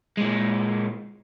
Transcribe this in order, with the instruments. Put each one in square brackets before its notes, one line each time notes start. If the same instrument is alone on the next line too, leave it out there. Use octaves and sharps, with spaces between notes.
[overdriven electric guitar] A#2 G#3